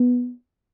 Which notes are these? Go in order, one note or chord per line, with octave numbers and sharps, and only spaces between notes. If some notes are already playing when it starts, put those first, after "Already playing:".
Already playing: B3